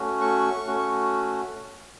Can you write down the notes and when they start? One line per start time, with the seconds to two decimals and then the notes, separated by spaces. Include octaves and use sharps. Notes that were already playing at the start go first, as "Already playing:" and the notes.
Already playing: A3 C#4 F#4
0.21 C#6
0.67 A3 C#4 F#4